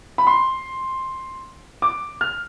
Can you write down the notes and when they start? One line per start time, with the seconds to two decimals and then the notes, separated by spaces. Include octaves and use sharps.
0.18 B5
0.27 C6
1.82 D6
2.21 F6